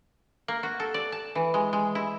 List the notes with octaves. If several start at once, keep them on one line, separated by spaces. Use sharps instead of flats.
A#3
F#4
A4
D5
A5
E3
G#3
G#3
E4